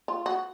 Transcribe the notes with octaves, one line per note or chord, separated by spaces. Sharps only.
F4
F#4